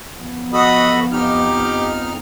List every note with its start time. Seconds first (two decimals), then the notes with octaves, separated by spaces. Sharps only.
0.21 F3 B3
0.53 F#4 A4 D#5 B5
1.12 F2 D#4 G4 F6